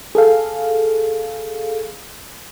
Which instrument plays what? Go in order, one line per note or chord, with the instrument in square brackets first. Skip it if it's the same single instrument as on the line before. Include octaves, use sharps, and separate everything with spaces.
[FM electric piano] G#4 A4 F5